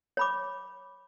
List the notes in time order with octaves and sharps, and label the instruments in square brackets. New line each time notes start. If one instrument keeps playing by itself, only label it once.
[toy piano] C#5 B5 D6